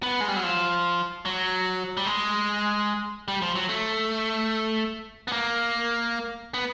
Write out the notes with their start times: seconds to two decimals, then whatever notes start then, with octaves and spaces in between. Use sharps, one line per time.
0.03 B3
0.20 G#3
0.28 G3
0.36 F#3
0.43 F3
1.25 F#3
1.97 G3
2.07 G#3
3.28 G3
3.42 F3
3.56 F#3
3.69 A3
5.28 B3
5.32 A#3
6.54 B3